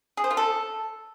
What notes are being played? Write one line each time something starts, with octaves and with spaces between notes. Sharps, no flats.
G#4
C5
F4
A4